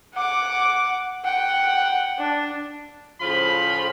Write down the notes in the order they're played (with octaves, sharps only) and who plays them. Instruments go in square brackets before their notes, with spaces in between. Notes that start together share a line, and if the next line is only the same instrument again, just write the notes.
[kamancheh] F#5 D6
F#5 G5
D4
[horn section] A2 C#3 F3 F4 C5 B5